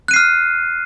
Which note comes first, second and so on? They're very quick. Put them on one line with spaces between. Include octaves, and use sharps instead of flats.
F#6 D#7 C7 F6